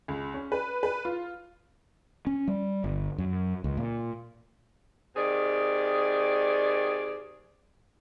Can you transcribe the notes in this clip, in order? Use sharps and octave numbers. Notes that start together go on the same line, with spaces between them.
C#2
C#4
B4
B4
F4
C#4
G3
G1
F#2
C#2
A#2
C3 D#3 G#4 D5